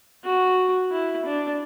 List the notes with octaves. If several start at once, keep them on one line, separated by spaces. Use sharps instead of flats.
F#4
E4
D4